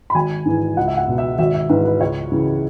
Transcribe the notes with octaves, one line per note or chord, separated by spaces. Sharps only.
B5
G#1 G#5
G#2 E3
C#2 F#5
E5
F#5
B2
E5
G#1 E5
E5
G#2 E3 B4
B4
C#2 C#5
C#3 E3